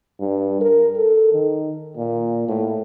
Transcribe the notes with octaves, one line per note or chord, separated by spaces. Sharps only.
G2
A#4
A4
D#3
A#2
A2